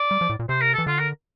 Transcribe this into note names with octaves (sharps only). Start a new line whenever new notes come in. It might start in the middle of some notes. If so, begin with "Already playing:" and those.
Already playing: D5
G3
F3
A2
A#2
C3 C5
A#4
A4
E3
D3 F4
A#4